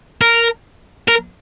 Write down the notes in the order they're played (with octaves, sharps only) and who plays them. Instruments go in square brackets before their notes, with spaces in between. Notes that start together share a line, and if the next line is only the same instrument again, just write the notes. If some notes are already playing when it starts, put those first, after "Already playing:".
[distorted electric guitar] A#4
A#4